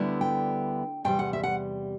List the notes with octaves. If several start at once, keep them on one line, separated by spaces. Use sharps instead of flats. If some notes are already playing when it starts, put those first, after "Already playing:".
Already playing: D2 D3 G3 B3 E4
G5
E2 C3 G3 G5
F#5
E5
F#5